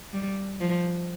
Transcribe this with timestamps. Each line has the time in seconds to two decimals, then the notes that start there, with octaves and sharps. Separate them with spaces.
0.13 G3
0.60 F3